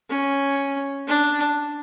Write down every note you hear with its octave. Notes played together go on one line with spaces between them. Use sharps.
C#4
D4